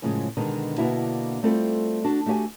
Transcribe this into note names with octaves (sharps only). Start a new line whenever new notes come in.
F#2 A2 C#3 F3 G3 G#3
B2 D3 D#3 G#3
B2 D3 A#3 D4 E4 F#4
G3 A3 C4 F4 A4
D4 F#4
A3 F#4 G4 F#5 G#5